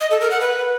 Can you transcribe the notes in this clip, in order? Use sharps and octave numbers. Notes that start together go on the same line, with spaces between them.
D#5
A4
A#4
F#5
B4